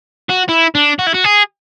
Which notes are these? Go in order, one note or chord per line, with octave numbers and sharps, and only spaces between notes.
F#4
E4
D4
F#4
E4
F#4
G#4